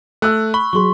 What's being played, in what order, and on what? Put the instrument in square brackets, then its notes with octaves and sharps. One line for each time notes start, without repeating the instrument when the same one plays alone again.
[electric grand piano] A3 [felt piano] E6 F#6
[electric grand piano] B5 [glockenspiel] C#6
[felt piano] F#3 G#4 [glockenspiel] C6 C#6